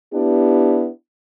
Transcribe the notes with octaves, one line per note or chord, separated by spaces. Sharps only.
B3 D4 E4 G4